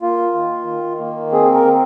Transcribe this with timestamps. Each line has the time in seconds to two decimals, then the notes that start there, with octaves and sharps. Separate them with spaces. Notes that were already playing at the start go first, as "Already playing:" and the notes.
0.02 A#3 F4
0.34 D#3
0.67 D#3
1.00 A#3
1.32 C4 G#4
1.54 A#4
1.65 C4